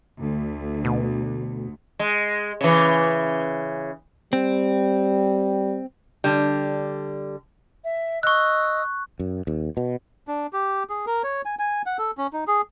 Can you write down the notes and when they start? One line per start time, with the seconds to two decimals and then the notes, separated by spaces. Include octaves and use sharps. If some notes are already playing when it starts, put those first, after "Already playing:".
0.19 D2
0.85 B2
1.99 G#3
2.61 C#3 E3
4.33 G3 C4
6.24 D3 G3
7.83 E5
8.23 D#5 C#6 D#6 E6 F#6
9.19 F#2
9.47 D#2
9.77 B2
10.28 D4
10.53 G4
10.90 G#4
11.06 A#4
11.24 C#5
11.45 G#5
11.59 G#5
11.86 F#5
11.98 A4
12.18 C#4
12.33 D#4
12.48 G#4